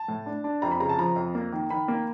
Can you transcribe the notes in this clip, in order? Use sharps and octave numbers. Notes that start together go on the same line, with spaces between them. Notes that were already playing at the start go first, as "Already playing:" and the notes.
Already playing: A5
A2
D4
D4
F2 A#5
B5
C#3 A#5
A5
F3 A#5
F2
A#3
D#3
D#3 B5
A#3